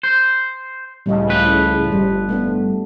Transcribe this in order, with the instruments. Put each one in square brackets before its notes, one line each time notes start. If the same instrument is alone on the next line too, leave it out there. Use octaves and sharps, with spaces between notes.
[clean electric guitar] C5
[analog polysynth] C#2 A2 C#3 [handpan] G3 D#5
[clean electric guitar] F3 B4 [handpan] A3
[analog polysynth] G1 [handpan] G3
[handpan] A3 B3 D4